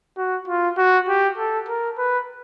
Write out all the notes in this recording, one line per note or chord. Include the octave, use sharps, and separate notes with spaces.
F#4
F4
F#4
G4
A4
A#4
B4